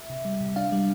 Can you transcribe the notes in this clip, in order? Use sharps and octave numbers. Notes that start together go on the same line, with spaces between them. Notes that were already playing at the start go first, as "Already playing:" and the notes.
Already playing: E5
C3
G3
C3
D4 F5
G3